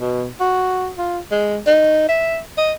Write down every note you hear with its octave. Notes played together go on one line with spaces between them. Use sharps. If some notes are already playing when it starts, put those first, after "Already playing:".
B2
F#4
F4
G#3
D#4
E5
D#5